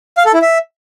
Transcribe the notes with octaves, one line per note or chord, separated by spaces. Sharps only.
F5
A4
E4
E5